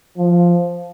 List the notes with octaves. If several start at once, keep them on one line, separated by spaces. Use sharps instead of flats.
F3